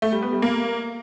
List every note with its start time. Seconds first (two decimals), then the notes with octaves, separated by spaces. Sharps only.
0.02 A3
0.12 G3
0.22 B3
0.32 G3
0.42 A#3